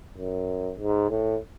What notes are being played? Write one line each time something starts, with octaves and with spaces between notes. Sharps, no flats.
F#2
G#2
A2